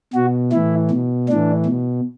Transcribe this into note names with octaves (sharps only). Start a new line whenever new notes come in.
B2 F#4
A2 E3 E4
B2
A2 E3 D4
B2